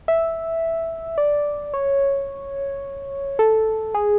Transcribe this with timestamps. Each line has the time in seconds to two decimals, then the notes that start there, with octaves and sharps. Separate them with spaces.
0.08 E5
1.18 D5
1.74 C#5
3.39 A4
3.95 G#4